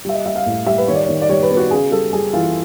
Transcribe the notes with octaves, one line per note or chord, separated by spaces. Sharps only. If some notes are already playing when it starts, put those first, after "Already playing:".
G3 E5
D#5
G3 E5
F5
A2
G3 E5
B4
D#3 C#5
D5
C#5
D#3
D5
G3 C#5
B4
B3
F#4
C#3 G#4
G3 A4
G3 G#4
E3 F4